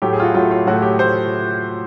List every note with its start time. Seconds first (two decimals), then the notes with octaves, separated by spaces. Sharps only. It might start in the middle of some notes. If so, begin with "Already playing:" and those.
0.02 A2 F#3 A3 G4
0.13 G#4
0.20 F4
0.23 F#4
0.34 A2 F#3 A3 F4
0.51 F4
0.67 A2 F#3 A3 F#4
0.82 G4
0.99 A3 C5